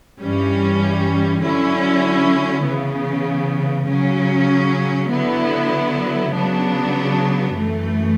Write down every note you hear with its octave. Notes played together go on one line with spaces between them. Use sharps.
G2 E3 G3 C#4
D3 F#3 C#4 E4
C#3 E3 B3
C#3 F#3 C#4
D3 F#3 B3 E4
C#3 F#3 B3 D4
F#2 E3 A3